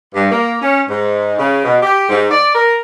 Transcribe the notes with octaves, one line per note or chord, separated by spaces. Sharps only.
G2
A#3
C#4
G#2
C#3
B2
G4
G#2
D5
A#4